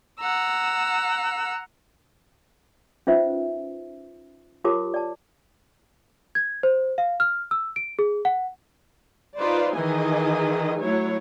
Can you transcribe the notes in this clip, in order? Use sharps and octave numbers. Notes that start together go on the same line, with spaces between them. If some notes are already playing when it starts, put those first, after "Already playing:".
F#5 A#5 E6
C#4 D#4 F4 B4 C5 E5
F4 G4 A#4 C#5 A5 D6
D5 A5
G#6
C5
F5
F6
E6
D7
G#4
F#5
D#4 F4 B4 C5 D5
D#3 E3 G#4 D#5 G#5
F#3 A3 E4 C#5